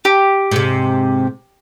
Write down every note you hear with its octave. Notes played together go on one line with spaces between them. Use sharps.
G4
G#2 C3